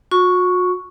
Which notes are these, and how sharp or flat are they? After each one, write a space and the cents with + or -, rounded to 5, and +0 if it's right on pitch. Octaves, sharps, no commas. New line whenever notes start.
F#4 -40 C#6 +0